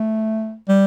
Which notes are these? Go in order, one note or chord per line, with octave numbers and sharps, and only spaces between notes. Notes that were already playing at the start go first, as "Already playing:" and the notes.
Already playing: A3
G3